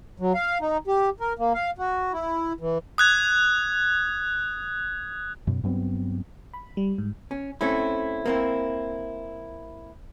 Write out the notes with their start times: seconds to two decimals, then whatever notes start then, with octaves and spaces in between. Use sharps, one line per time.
0.20 F#3
0.34 F5
0.61 D#4
0.87 G4
1.20 A#4
1.39 A#3
1.54 F5
1.78 F#4
2.13 E4
2.60 E3
2.98 D#6 F#6 G#6
5.47 F#2 B2
5.63 G2 F#3 B3 C4
6.54 B5
6.77 G3
6.98 G#2
7.31 C#4
7.61 A3 C4 C#4 E4
8.26 A#3 C4 E4